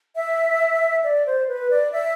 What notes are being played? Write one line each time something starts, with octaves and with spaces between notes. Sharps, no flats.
E5
D5
C5
B4
D5
E5